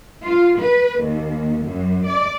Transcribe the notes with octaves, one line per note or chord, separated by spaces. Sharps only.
F4
B4
D#2
F#2
D5